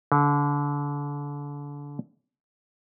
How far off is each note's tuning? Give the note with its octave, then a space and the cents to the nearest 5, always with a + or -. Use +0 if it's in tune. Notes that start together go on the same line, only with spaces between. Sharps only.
D3 -30